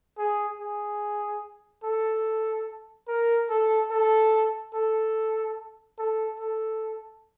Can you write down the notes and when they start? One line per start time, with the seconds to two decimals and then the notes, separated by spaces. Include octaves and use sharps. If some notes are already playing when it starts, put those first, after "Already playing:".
0.18 G#4
0.59 G#4
1.84 A4
3.08 A#4
3.50 A4
3.91 A4
4.74 A4
5.99 A4
6.40 A4